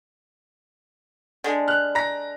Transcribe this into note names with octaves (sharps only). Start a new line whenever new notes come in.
D3 G#3
F6 F#6
A#5 A#6